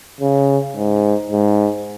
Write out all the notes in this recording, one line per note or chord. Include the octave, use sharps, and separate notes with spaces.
C#3
G#2
G#2